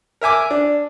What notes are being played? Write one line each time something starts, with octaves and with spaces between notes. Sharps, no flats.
A#4 E5 G#5 D6
D4